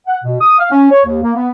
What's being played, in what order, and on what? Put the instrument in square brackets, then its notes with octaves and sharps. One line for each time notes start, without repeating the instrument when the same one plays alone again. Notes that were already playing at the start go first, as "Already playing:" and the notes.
[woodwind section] F#5
B2
D#6
F5
C#4
C#5
D#2
A#3
B3